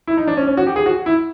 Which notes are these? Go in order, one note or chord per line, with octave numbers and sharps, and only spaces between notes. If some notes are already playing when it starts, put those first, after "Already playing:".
E4
D#4
D4
C#4
C#4
F#4
G4
G#4
F#4
E4